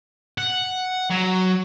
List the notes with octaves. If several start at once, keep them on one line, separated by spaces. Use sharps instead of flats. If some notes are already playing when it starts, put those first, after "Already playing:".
F#5
F#3